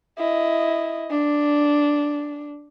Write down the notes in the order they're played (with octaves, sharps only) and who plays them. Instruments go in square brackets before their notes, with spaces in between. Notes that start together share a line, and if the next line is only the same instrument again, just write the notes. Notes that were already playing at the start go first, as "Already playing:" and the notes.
[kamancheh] E4 D#5
D4